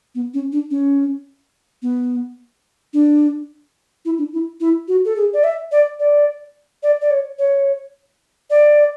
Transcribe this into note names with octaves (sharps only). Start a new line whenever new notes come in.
B3
C#4
D4
C#4
B3
D4
E4
D4
E4
E4
F#4
A4
G#4
D5
E5
D5
D5
D5
D5
C#5
C#5
D5